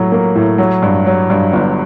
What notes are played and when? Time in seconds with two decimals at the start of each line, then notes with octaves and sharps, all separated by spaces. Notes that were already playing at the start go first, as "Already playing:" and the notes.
Already playing: A2 F#3
0.12 A#3
0.35 A2
0.58 F#3
0.82 G2
1.06 F#3
1.30 G2
1.53 G1